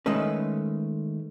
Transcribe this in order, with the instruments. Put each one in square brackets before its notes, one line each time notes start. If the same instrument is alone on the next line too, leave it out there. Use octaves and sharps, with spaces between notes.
[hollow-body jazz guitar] D#3 G#3 A3 C#4 B4